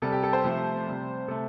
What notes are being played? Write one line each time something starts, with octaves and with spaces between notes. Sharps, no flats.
C3 G3 A4
G4
A4
C5
C3 F3 A3
C3 G3
C3 A3 A4